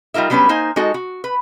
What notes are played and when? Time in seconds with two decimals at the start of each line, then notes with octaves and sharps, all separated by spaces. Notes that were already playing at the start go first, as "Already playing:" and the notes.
0.14 G3 D#4 F4 A#4 E5
0.30 F#3 G3 B3 C#4 D4 B4
0.49 A#3 D#4 C5 G#5
0.76 G#3 D#4 F#4 A4
0.94 F#4
1.24 B4